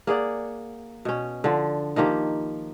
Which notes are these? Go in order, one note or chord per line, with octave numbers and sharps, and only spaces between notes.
A#3 G#4 D5 F#5
B2 C#4
D3 F3
D#3 F3 A#3 G4